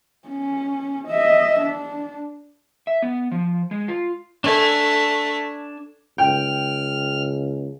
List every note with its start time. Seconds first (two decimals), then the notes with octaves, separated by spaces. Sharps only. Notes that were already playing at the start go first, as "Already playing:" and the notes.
0.28 C#4
1.08 D#5 E5
1.60 D4
2.87 E5
3.02 B3
3.31 F3
3.71 G#3
3.88 F4
4.44 A3 D4 G#5
6.18 C#2 G5 F6